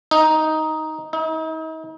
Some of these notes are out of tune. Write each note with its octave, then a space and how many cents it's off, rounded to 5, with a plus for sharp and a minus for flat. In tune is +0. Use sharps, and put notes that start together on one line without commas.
D#4 +5
D#4 +40